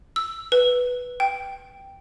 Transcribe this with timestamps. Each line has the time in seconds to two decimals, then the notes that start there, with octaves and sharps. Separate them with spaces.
0.16 E6
0.52 B4
1.20 G5